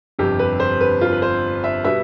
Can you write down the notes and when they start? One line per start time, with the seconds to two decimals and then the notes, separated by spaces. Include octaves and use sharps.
0.19 G1 F2 C3 G4
0.39 B4
0.60 C5
0.81 B4
1.01 F4
1.12 B4
1.22 C5
1.64 E5
1.84 B2 G3 B3 E5